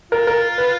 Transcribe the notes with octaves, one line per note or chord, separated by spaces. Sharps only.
F4 A#4
A#4
B4